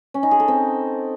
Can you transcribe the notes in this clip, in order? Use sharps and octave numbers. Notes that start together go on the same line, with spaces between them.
C#4
D#4
G#4
A4
C4